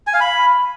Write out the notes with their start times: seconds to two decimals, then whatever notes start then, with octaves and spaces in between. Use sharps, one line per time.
0.07 G#5
0.14 F5
0.21 B5